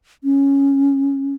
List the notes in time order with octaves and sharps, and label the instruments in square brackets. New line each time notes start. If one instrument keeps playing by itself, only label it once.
[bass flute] C#4